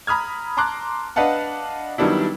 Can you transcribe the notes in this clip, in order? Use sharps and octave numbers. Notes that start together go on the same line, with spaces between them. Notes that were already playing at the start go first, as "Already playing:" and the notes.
A#5 B5 D#6 F6 G#6
A5 A#5 C6 D6 F#6
D4 B4 D#5 F5 F#5 A5
D#3 F#3 G3 B3 D4 E4